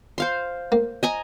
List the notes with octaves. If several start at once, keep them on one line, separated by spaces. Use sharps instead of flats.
C5 F5 C6
A#3
D#5 G#5 A#5